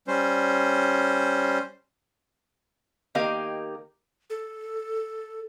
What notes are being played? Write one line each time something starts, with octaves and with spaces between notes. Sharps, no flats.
G3 C#4 C5
D#3 A#3 G4 A#4 D#5 F5
A4